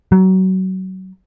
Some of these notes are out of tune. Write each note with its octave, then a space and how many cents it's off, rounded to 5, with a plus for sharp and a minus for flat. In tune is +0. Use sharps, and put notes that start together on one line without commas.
F#3 +25